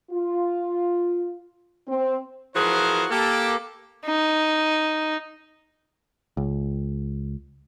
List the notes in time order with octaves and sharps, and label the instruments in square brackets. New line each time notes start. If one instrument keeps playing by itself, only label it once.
[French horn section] F4
C4
[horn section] E3 F3 F#4 G#4 A#4 C5
A#3 G4 A4
[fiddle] D#4
[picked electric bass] C#2